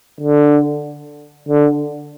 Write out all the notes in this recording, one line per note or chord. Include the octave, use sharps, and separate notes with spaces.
D3
D3